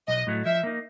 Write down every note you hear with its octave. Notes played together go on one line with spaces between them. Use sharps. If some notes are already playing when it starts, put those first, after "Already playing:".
B1 D#5
A2 F#3 A3
F3 E5
A#3 D#4